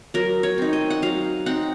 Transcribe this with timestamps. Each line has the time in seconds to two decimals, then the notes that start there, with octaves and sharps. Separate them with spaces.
0.14 F#3 A#4
0.43 C#5
0.58 C4 D#4
0.73 D#5
0.90 F#5
1.02 F#3 F5
1.46 C4 D#4 F#5